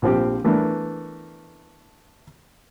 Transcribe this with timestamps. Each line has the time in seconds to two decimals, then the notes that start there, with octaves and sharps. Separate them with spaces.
0.02 A#1 F3 C4 G4
0.44 E3 A3 B3 D4 A#4